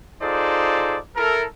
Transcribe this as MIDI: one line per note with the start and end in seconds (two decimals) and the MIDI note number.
0.22 0.99 63
0.22 0.99 65
0.22 0.99 68
0.22 0.99 69
0.22 0.99 72
0.22 0.99 74
1.16 1.45 64
1.16 1.45 69
1.16 1.45 70